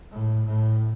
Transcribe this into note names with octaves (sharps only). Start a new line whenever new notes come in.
A2
A2